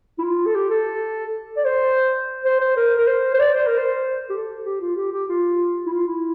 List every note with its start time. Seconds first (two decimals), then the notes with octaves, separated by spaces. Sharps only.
0.19 E4
0.23 F4
0.46 A4
0.55 G4
0.70 A4
1.57 D5
1.65 C5
2.45 C5
2.61 C5
2.77 A#4
2.98 A#4
3.07 C5
3.34 C5
3.39 D5
3.54 C5
3.67 A#4
3.78 C5
4.30 G4
4.33 A4
4.65 G4
4.81 F4
4.96 G4
5.12 G4
5.29 F4
5.86 E4
5.92 F4
6.08 E4